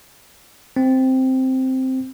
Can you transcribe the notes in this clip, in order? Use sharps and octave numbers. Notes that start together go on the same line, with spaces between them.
C4